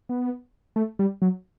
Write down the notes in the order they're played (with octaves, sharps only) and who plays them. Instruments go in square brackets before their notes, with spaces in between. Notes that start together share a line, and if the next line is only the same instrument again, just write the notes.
[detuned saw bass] B3
A3
G3
F#3